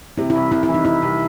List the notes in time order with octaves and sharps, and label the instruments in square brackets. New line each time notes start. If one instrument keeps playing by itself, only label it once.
[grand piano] C3 [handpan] E4
[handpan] E4
[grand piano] C2
[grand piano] C2 [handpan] E4
[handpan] E4
[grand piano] E3
[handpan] D#4
[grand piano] C3 [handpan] E4
[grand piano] C2